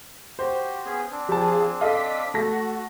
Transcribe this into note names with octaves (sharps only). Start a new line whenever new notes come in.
F#4 G4 C5
B3 C#4 G#4
C4 D4
F3 G4 G#4 A5
A4 D#5 F5 D6 B6
A3 F#4 A5 A#6